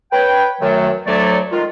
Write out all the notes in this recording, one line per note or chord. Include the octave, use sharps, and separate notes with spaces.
B4 C#5 G5
F#2 D#3 F#3 A3
D2 F#3 A3 D5
D#3 G#3 F4